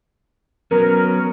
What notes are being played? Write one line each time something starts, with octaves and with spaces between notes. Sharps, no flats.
F#3 B3 C#4 A#4